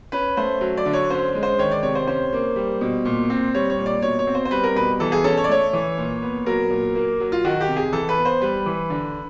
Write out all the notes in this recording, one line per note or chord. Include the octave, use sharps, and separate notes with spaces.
C#4 B4
A3 C5
F#3
D5
D3
C#5
C#4 C5
G#3
C5
D#3 C#5
D5
C3 C#5
C5
C#4 C5
A#3
G3
B2
A#2
C4
G3 C#5
C#5
A#2
D5
B2 C#5
C#5
C4
C5
C5
G3 B4
A#4
B2 B4
E3 A4
G#4
C#4 A4
C#5
D5
A3 C#5
E3
A#2
B3
F#3 A#4
A#2
A#3
F#3
F4
D#3 F#4
G4
C3
G#4
E3 A4
B4
B3
C5
G3 B4
E3
D3